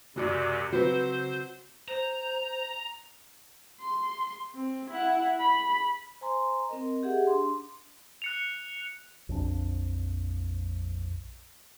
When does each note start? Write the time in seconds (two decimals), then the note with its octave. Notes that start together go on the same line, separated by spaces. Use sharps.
0.16 C#2 F#2 C3 F#4 D5
0.73 C#3 F#3 C4 B4 C5
1.88 C5 A#5
3.80 C6
4.55 C4
4.90 E4 F#5
5.39 B5
6.21 C5 G#5 A#5 C6
6.69 C4 A#4 D#5
7.03 G4 G#4 E5 F#5
7.27 D4 C6
8.22 F#6 C#7 F7
9.29 A#1 F2 D4